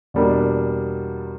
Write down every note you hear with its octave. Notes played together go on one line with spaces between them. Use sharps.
E2 B2 G3 A#3 D4